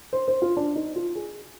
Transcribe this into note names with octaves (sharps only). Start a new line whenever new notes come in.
C5
C5
F4
D4
D#4
F4
G#4